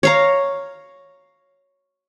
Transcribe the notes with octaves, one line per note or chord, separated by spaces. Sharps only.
C#5 F5 A#5